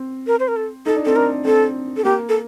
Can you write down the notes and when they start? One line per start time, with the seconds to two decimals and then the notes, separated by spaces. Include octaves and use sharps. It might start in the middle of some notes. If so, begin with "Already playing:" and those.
Already playing: C4
0.27 A#4
0.40 C5
0.48 A#4
0.56 A4
0.86 D#4 A4
0.96 D4
1.05 C4 A4
1.16 D4 A#4
1.45 C4 A4
1.97 A4
2.04 A#3 G4
2.29 A4